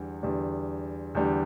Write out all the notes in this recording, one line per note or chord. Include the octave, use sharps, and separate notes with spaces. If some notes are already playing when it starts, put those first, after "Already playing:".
Already playing: E2 D3 G3
E2 D3 G3
E2 D3 G3